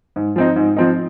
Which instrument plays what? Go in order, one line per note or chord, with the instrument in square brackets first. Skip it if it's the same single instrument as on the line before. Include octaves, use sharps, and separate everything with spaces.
[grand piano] G#2
F3 C4 D#4
G#2
F3 C4 D#4